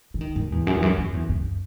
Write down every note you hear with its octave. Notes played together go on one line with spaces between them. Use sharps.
E3
D#3
G#2
E2
F#2
E2
F#2
F#2
E2
F#2